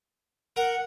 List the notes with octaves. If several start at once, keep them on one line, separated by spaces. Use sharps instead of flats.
A#4 F#5